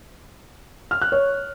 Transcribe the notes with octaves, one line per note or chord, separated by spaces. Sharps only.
F6
F#6
C#5